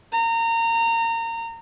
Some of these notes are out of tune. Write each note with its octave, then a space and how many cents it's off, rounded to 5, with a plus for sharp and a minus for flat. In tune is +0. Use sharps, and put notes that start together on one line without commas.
A#5 -25